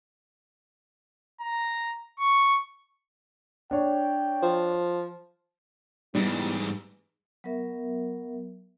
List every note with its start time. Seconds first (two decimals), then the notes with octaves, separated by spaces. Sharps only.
1.41 A#5
2.19 C#6
3.71 D4 C#5 G5
4.42 F3
6.15 G#2 E3 G3 B3 E4
7.44 F#3 B3 A#4 E5